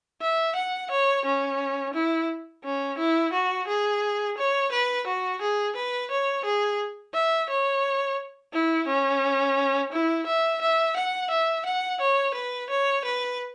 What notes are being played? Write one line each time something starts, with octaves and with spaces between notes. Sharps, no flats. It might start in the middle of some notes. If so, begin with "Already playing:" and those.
E5
F#5
C#5
C#4
E4
C#4
E4
F#4
G#4
C#5
B4
F#4
G#4
B4
C#5
G#4
E5
C#5
E4
C#4
E4
E5
E5
F#5
E5
F#5
C#5
B4
C#5
B4